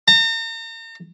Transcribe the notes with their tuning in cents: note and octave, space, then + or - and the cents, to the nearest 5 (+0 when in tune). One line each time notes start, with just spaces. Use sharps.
A#5 -40